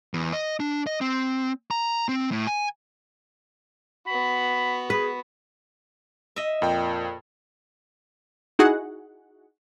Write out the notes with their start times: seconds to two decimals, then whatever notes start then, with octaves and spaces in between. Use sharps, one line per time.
0.14 E2
0.33 D#5
0.60 D4
0.87 D#5
1.01 C4
1.71 A#5
2.09 C4
2.32 A2
2.47 G#5
4.07 B3 F#4 B5
4.90 G#4 B4
6.36 D#5 E5
6.62 F2 A#2 G5
8.59 D#4 E4 F#4 G#4 F#5